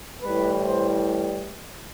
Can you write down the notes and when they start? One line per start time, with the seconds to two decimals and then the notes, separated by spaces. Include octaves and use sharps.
0.23 A2 E3 G3 B4
0.63 C5